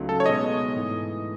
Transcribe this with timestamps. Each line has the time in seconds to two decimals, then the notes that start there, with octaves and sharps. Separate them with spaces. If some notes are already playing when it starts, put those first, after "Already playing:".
Already playing: C#2 C#3 F#3 A3 D#4
0.09 A4
0.20 C#5
0.25 B2 G#3 B3 D#4 D#5
0.75 G#2 E3 A3